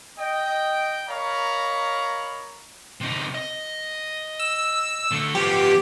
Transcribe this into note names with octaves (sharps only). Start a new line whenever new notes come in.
D#5 G5
A#4 C#5 D#5 F5 A#5 B5
C3 D#4
D#5
E6
D3 A3
F3 B3 G4